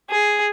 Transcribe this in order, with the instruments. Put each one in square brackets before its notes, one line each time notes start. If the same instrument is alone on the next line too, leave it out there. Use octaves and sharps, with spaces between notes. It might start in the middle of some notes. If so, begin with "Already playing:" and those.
[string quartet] G#4